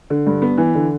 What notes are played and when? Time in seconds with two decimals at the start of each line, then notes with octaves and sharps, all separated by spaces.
0.10 D3
0.27 G2
0.42 B3
0.58 E3
0.75 D3